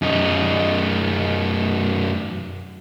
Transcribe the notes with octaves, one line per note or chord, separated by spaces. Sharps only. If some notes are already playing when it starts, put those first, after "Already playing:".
F#2 D#4